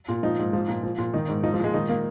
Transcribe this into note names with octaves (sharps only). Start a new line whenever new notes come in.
A#2
F3 D#4
G#2
F3
A#2
F3
A#2
D#3 D#4
G#2
F3 D#4
F3
A#2 G#3
D#3 D#4
A#3